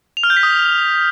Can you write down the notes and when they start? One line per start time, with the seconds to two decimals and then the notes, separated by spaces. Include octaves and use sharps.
0.17 F7
0.23 F6
0.30 G6
0.37 B6
0.43 D#6